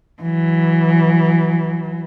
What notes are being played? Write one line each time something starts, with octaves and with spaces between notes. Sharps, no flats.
E3 F#3